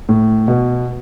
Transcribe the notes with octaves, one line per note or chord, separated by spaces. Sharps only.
A2
B2